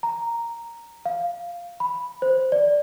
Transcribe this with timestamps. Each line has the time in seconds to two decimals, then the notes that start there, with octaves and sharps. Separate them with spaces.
0.03 A#5
1.06 F5
1.80 B5
2.22 C5
2.52 D5